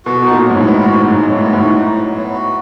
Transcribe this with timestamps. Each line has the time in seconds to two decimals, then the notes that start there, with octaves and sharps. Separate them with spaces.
0.05 B2 F#4
0.22 B2 D#4
0.31 A#2
0.44 F#3
0.50 G#2
0.57 A2
0.63 B3
0.83 G#2 F#4
1.02 D#4
1.07 G#2
1.19 F#3
1.32 A2
1.38 B3
1.53 G#2
1.58 A2 F#4
1.77 D#4
1.95 F#3
2.15 B3
2.33 F#4